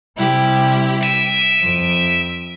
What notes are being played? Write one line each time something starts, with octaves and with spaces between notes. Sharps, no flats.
C3 G3 E4 G4
E5 D7 D#7
F2